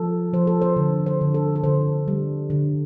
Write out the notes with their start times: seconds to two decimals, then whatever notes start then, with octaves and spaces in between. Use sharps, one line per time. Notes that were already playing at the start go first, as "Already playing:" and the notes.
Already playing: F3 A4
0.33 F3 C5
0.47 A4
0.62 C5
0.76 D3
1.06 C5
1.21 D3
1.34 A4
1.56 A4
1.64 D3 C5
2.08 G3
2.50 D3